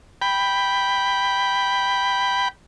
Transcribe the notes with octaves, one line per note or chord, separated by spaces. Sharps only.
G5 B5